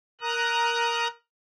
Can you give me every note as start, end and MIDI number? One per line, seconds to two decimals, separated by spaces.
0.21 1.08 70
0.21 1.08 82
0.21 1.08 87
0.21 1.08 90